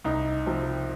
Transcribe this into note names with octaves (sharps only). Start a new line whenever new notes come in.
C2 D#4
C3 F3